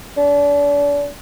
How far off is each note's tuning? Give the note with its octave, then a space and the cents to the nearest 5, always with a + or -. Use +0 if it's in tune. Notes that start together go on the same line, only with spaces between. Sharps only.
D4 -35